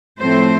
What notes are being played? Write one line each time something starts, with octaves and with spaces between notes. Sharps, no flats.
A2 F3 A3 C4 C5